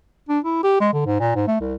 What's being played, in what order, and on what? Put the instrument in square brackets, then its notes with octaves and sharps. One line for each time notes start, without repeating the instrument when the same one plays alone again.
[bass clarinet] D4
E4
G4
G#3
D3
G#2
A#2
G#2
A3
C2